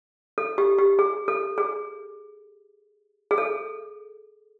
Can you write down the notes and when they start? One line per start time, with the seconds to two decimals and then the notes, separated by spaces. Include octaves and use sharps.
0.38 A4
0.58 G4
0.78 G4
0.99 G#4
1.28 A4
1.58 G#4
3.31 G#4
3.38 A4